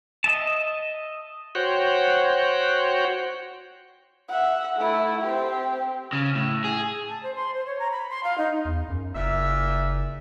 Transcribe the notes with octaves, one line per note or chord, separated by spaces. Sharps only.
D#5 E5 A5
F#4 C5 C#5 F#5 G5
E5 F#5
A3 E4
C4 G4
C#3
A2
G#4
A5
C5
C6
C5
C#5
A#5
B5
C6
F5
D#4
E2
F#2
F#1 A#2 E5